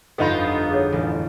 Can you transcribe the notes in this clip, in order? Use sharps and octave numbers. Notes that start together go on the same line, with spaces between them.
G1 F2 B3 D#4 F4 A4 B5
G#4 C#5
A1